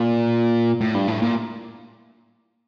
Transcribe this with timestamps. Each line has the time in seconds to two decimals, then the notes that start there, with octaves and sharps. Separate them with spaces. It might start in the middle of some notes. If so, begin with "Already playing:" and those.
Already playing: A#2
0.81 A2
0.95 G2
1.08 A2
1.22 A#2